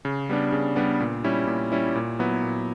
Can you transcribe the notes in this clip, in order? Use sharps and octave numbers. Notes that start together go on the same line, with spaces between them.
C#3
G3 B3 D4
C#3
G3 B3 D4
A#2
G3 C#4 E4
A#2
G3 C#4 E4
A#2
F#3 B3 E4
A#2